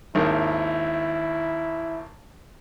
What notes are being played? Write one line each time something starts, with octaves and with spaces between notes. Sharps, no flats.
G#1 D#2 D#3 E4